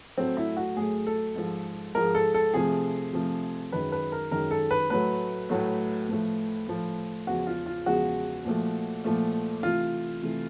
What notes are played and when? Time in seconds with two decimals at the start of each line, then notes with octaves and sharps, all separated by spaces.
0.18 A2 F#3 A3 C4
0.37 E4
0.57 F#4
0.77 A2 F#3 A3 G#4
1.07 A4
1.36 G#2 F3 G#3
1.95 G#2 F3 G#3 A#4
2.15 A4
2.34 A4
2.54 C3 F3 A3 G#4
3.13 C3 F3 A3
3.72 F#2 D#3 G#3 B4
3.92 B4
4.12 A#4
4.31 F#2 D#3 G#3 A#4
4.51 A4
4.71 B4
4.90 A2 F#3 A3 B4
5.49 A2 F#3 A3
6.09 A2 F3 A3
6.68 A2 F3 A3
7.27 E2 C#3 F3 G#3 F#4
7.47 F4
7.66 F4
7.86 E2 C#3 F3 G#3 F#4
8.45 A#2 F3 A3
9.04 A#2 F3 A3
9.63 C3 E3 A3 F4
10.23 C3 E3 A3